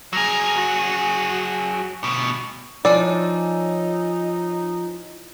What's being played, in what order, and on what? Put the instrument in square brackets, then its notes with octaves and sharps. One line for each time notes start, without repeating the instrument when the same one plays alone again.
[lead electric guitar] F#3 G#4 [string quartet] A#5 F6 G#6
[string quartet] F#4
[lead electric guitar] D2 B2
[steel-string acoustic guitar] F3 [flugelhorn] D#4 [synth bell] C#5 G#5 E6 [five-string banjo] D5